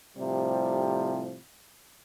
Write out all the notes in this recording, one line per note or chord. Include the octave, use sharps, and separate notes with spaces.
A2 C3 F3 G3